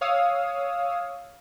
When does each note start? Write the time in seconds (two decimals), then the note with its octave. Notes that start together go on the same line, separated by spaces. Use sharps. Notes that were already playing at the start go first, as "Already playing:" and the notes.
0.01 C#5 F5 D#6 E6